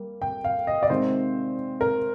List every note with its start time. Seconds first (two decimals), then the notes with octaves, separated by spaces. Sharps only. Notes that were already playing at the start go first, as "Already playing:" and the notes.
Already playing: G3 A#3
0.22 G5
0.44 F5
0.67 D#5
0.83 D5
0.90 C3 D#3 G#3 C4 C5
1.81 A#4